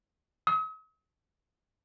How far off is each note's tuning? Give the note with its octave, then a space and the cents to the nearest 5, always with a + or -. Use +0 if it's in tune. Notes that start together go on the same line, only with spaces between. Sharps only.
D#6 +45